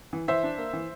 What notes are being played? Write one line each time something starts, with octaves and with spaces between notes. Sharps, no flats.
E3
E3 C5 E5
D4
A#3
E3